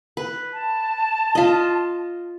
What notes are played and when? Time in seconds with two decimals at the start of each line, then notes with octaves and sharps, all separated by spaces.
0.17 B4
0.53 A5
1.35 F4 D#5